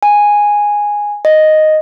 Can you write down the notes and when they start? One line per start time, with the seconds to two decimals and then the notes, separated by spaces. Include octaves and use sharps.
0.03 G#5
1.25 D#5